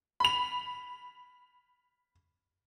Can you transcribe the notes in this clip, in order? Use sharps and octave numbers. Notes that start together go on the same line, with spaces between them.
B5 F7